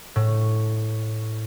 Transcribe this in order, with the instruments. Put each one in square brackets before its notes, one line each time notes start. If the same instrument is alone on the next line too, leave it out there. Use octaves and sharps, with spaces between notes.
[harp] A2